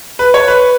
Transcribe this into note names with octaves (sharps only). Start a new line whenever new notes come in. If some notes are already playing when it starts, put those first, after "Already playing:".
B4
C#5
B4